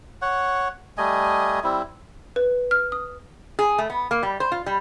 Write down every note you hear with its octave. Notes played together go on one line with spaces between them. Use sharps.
C#5 F#5
G3 A3 D#5 G#5
G3 C4 E4
B4
F6
D#6
G#4
A3
B3
A#3
G3
C5
F4
G3